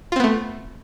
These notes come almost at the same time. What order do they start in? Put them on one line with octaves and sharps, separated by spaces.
F4 C4 B3 A3